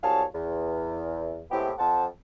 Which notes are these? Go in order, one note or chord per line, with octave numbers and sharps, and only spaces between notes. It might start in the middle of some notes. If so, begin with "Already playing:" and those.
C2 F#3 G#4 C#5 F5 A5
E2
A2 G#3 B3 C4 E4 G4
F2 C5 F#5 A5